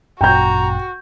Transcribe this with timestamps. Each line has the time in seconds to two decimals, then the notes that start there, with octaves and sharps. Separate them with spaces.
0.21 G#1 F#2 A#2 F#4 G5 A#5 G6